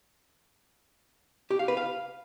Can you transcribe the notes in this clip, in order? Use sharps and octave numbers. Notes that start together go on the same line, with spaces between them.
G4
F5
B4
F5